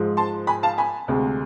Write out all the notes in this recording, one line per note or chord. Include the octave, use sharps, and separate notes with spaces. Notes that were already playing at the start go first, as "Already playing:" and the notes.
Already playing: G#2 F3 G#3
A5 C6
G#5 B5
F5 A5
G#5 B5
D2 C3 G#3